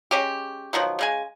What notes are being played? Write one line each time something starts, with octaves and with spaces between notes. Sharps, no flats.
G#3 C#4 G4
B2 D#3 F3 F#3
C#3 G#3 G#5